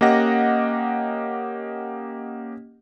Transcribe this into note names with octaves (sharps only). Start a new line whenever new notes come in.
A#3 C#4 G4 D#5 F#5 A#6